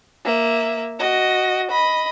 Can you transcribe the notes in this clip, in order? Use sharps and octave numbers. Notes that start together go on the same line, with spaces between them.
A#3 E5
F#4 D#5
D#5 B5